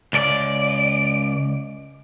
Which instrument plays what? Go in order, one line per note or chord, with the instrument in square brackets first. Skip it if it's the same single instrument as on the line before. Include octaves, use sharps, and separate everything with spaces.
[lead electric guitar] C#2 D5